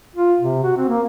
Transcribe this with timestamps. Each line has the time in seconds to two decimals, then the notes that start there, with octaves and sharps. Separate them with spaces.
0.16 F4
0.39 C3
0.64 F#4
0.77 C4
0.88 A#3